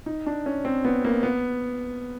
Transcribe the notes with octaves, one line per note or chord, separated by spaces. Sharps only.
D#4
D4
C#4
C4
B3
A#3
B3